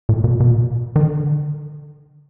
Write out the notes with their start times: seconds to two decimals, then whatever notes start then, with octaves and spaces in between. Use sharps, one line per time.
0.09 A#2
0.24 B2
0.32 C3
0.40 B2
0.96 D#3
1.01 D3